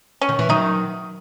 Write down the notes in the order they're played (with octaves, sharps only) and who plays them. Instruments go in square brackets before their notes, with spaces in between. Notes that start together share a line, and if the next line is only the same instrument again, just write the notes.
[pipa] C#4
[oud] D#3
E3
[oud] D#3 F#3 [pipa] D#4